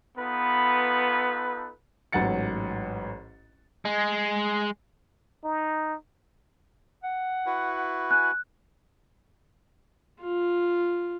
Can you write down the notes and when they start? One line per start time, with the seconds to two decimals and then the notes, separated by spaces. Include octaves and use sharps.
0.18 B3 D#4 F4 A4 B4
2.12 A1 G#2 F#3 F#5 A6 C#7
3.85 G#3
5.44 D#4
7.04 F#5
7.46 E4 F#4 B4
8.11 G#5 F#6
10.22 F4